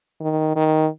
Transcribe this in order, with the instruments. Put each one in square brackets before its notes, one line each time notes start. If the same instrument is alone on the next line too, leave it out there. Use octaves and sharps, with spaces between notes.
[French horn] D#3
D#3